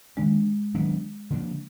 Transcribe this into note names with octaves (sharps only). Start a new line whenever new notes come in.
D#3 G#3 A#3 D4
D#3 F#3 B3 D4
D3 F3 A#3 D4